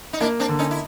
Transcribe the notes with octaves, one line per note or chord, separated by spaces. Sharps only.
D#4
A#3 D4 E4
C4 D4
D3
C#4 D#4
E4